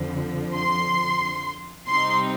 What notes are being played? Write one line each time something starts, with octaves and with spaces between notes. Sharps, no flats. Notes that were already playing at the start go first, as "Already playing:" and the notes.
Already playing: F2 D3 F3
C6
C3 G3 C4 D#4 C6